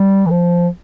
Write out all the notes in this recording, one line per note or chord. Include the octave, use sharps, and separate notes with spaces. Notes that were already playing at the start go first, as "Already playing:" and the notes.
Already playing: G3
E3
F3